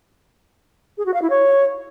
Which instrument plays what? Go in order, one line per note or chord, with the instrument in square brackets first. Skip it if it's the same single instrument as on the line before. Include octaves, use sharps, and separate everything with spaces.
[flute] G#4
F#4
F5
E4
C#5